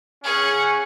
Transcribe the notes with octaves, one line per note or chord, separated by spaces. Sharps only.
C#4 G#4 F#5